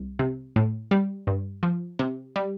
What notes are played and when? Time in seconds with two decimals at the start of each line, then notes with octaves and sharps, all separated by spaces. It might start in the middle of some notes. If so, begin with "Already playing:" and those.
Already playing: C2
0.19 C3
0.56 A2
0.91 G3
1.27 G2
1.63 F3
1.99 C3
2.36 G3